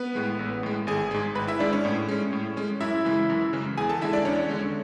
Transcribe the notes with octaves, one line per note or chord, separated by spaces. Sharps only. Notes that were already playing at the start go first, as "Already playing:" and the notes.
Already playing: B3 B4
A2 G#3
A1
A2 G#3
G#1 G#4 G#5
G#2 G#3
G#1 B4 B5
E4 E5
G#2 G#3 D4 D5
C#4 C#5
A2
G#3 C#4
A2
G#3 C#4
F#2 E4 E5
C#3 E3 G#3
F#2
C#3 E3 G#3
E2 G#4 G#5
A4 A5
D3 G#3 E4 E5
D4 D5
E2 C#4 C#5
D3 G#3